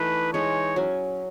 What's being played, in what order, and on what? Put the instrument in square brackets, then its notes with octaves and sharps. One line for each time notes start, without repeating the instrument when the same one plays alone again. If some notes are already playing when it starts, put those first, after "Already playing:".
Already playing: [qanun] E3 A3 D#4 [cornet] B4
[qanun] E3 G#3 D#4 G#4 [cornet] C#5
[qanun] F#3 C#4